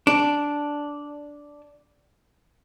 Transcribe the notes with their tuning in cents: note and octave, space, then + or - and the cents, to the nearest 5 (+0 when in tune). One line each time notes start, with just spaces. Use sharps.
D4 -5